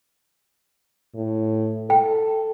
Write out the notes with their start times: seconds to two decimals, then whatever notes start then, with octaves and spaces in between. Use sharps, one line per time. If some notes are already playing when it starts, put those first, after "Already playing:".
1.14 A2
1.90 A4 G5